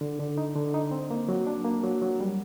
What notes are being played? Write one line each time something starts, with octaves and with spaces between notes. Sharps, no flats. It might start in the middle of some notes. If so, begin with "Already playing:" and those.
D3
D3
D#4
D3
D#4
C4
A#3
F#3
D4
A#3
F#3
F#3
G3